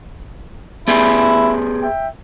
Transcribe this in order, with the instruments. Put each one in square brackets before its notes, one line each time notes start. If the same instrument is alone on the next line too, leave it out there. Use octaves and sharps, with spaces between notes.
[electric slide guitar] B3 G4 G#4 [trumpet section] E4
[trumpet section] E5 G5